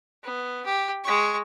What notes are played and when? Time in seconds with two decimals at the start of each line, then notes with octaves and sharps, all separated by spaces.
0.23 B3
0.66 G4
1.04 G#3 C#6